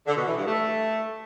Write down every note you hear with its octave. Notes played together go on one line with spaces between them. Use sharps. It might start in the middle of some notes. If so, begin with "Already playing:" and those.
D3
B2
E3
G2
A3